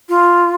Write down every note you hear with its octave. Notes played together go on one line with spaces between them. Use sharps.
F4